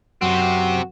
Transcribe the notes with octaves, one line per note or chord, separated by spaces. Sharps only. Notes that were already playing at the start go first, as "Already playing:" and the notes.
F#2 C3 C4 F#4